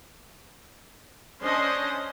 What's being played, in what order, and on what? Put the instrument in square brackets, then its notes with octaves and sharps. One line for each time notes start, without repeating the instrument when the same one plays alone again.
[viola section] C#4 D4 C5 D#5 C6